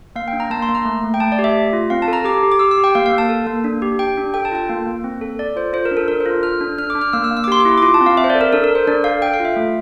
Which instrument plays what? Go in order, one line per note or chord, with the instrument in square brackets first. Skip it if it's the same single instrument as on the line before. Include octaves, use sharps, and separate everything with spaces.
[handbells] A#3 F5
G5
D4
A#5
A#3 A5
C6
A#3
A#5
A3
A3
G5
A3 A5
D5
G4
E5
A3
F4
C4 F5
A5
A4
A#5
G4 D6
G4
D6
G4 E6
E6
G4
G5
A#3 F5
F5
A#3
A5
A4
A#3
D4
G4
G4 G5
D4
A4 G5
A5
F4 G5
A#3
A#3
C4
A4
A4 D5
F4 C5
F4 C5
A#4
D4
A4
D4 A#4
C5
F4
A4 F6
D4
D4 F6
D6
D4
F6
A#3 E6
E6
A#3
E6
D6
G4 C6
D6
E4
D6
F4 C6
A5
C4
F5
C4 E5
C5
D5
A4
A#4
D4 A4
A#4
A4
C5
D4 D5
A4 F5
A4 G5
F5
F4 E5
A3